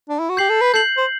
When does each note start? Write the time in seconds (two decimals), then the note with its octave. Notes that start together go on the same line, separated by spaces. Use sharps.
0.09 D4
0.19 E4
0.29 F#4
0.37 G4 G6 C7 F#7
0.49 A4
0.61 B4
0.73 A4 G6 C7 F#7
0.97 C5